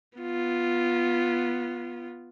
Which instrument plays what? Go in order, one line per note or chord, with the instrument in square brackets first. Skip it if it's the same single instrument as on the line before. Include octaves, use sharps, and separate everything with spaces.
[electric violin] B3 F4